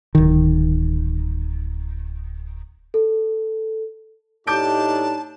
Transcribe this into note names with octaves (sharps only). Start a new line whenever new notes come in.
D1 D#3
A4
A2 D4 D#4 G4 A5 D6 G6 D7